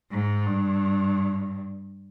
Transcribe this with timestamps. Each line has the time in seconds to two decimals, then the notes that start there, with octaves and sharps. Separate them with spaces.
0.12 G#2
0.47 G2